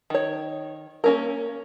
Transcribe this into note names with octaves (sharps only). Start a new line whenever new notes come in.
D#3 C#5
A#3 C#4 A#4